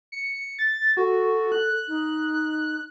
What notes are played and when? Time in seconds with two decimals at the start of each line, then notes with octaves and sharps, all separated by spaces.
0.12 C#7
0.59 A6
0.97 F#4 A4
1.52 F#6
1.88 D#4